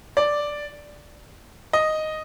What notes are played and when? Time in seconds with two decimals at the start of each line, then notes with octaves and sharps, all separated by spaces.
0.17 D5
1.73 D#5